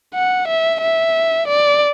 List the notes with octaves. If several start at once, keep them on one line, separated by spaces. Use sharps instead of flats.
F#5
E5
E5
D5